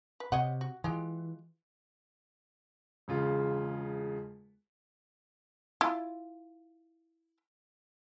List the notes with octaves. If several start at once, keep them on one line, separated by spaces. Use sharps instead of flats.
B4
C3 C#5 D#5 F#5
F#4
E3 G#3 F4 G4
E1 C#3 F4
E4 F4